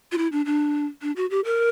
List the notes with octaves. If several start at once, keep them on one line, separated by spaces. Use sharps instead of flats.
F4
E4
D4
D4
D4
F#4
G4
A#4